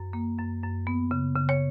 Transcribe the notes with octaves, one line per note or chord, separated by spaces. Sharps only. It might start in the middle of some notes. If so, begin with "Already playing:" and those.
Already playing: F#2
A#3
F#2
F#2
B3
C#3
C#3
C#5